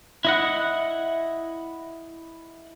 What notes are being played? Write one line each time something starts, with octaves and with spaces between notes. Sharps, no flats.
E4 D#5 F#5